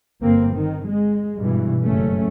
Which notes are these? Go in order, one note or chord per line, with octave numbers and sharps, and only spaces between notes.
G1 A#3 C4
D#3
G#3
G2 B2 E3
F#1 G2 A3 C#4